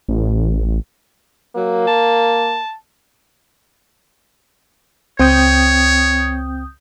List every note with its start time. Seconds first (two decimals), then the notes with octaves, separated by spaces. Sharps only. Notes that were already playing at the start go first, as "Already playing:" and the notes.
0.09 A1
1.56 F#3 A#3
1.87 A5
5.19 C#2 C4 C#5 G5 D#6 G6